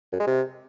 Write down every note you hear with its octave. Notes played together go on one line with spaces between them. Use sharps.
F#2
G#3
C3